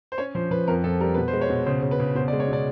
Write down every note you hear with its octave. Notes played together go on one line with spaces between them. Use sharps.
C5
C#4 C#5
F3 C5
F3 B4
F2 A#4
F2 A4
G3 A#4
B2 B4
C5
G#3
C#5
B2
C#3 C5
C#3
B4
C#3
B2 C5
D5
G#3
C#5
B2 D5